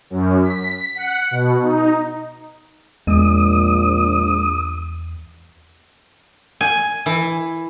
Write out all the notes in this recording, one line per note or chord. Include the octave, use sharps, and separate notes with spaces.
F#2
B6
F#5
B2
D#4
A#1 E2 G#3 D#6
G#5
E3